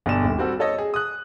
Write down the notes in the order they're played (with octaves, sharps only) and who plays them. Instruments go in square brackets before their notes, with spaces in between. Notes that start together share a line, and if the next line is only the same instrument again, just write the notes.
[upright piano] G1 B2 D5 E7
D#1
G3 C4 F#4 A4
A4 C#5 D#5
G#4
D#6 F#6